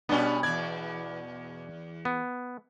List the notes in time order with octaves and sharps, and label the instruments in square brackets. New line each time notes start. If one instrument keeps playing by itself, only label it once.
[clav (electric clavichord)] B2 B3 [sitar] G3 C#4 B4 [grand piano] D4
[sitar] E2 D5 [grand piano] G#6
[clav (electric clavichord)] B3